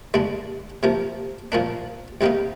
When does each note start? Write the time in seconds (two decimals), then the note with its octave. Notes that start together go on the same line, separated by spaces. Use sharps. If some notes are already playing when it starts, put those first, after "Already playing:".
0.14 D#2 D3 G#3 D4
0.83 C3 F3 A#3
1.52 A#2 F3 A#3 D4
2.21 C2 C3 D#3 A#3 D#4